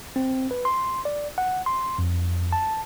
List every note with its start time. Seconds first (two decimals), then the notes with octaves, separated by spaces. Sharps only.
0.16 C4
0.51 B4
0.65 C6
1.05 D5
1.38 F#5
1.66 C6
1.98 F2
2.52 A5